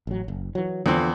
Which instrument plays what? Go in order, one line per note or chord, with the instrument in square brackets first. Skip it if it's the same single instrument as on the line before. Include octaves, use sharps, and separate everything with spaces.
[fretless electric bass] A1 F#3
F#1
E3 F#3
[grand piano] E2 C4 [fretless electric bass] D3 F3